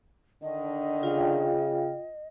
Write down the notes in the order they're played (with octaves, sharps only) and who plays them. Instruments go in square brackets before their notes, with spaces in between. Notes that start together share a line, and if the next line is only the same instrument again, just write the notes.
[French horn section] D3 D#3 D4 [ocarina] D#5
[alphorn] C#3 [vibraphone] F4 F5 G5